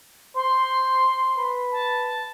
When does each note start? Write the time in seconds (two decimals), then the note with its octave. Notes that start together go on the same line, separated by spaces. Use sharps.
0.36 C5 C6
1.38 B4
1.72 A5